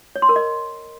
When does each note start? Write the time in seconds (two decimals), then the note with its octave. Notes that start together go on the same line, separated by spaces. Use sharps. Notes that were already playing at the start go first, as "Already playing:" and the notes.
0.16 C#5
0.22 C6
0.29 A#4
0.36 D#5